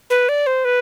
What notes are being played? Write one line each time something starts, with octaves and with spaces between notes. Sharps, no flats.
B4
D5
C5
B4